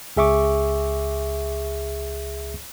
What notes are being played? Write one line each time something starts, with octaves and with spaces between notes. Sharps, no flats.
C#2 G#4 E5 C#6 D6